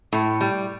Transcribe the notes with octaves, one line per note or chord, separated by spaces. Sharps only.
A2
G3